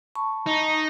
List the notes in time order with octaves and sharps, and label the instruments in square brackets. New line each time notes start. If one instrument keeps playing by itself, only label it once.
[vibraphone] A5 B5 C#6
[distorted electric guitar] D#4